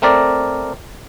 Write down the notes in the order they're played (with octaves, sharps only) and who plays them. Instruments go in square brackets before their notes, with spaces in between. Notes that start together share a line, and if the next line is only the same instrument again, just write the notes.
[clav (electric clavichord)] A3 C4 A#4 D5